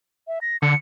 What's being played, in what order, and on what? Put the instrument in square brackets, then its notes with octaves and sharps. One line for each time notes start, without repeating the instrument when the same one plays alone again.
[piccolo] E5
A#6
[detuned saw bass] D3 [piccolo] C#7